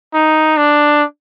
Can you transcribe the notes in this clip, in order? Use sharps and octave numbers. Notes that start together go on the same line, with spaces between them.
D#4
D4